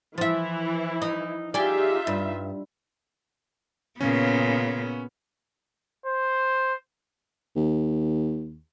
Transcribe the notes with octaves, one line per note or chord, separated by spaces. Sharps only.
E3 F3 E4 E5
D#4
D#4 F4 G4 G#4 D5 E5
G2
A#2 C#3 B3 C#4
C5
D#2